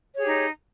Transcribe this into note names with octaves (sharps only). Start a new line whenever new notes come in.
D#4 G4 G#4 C#5